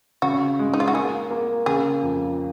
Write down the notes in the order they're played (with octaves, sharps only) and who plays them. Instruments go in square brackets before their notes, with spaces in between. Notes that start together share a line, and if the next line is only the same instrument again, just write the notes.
[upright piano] C#3 [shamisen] F#4
[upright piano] G#3
[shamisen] D#4
F4
F#4
[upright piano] A#3 [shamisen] G#4
[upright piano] A#3
[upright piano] C#3 [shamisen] G#4
[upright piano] F2